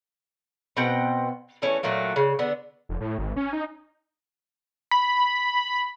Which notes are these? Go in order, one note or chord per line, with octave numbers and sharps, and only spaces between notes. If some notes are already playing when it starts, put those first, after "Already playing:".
B2 C4 F#5 G5
E3 A3 C#4
A#2 F#3 A3 A#3
C#3
D3 B3
F1
A2
G#1
C#4
D#4
B5